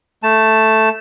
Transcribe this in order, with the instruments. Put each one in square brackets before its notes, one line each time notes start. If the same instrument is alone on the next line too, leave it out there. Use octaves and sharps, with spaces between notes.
[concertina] A3 A5